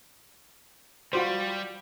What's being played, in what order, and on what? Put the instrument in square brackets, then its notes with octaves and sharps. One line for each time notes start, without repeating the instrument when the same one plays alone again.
[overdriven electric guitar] G3 [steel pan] F4 F#4 C5